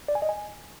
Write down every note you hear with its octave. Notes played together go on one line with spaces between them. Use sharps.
D5
G#5
D#5
G#5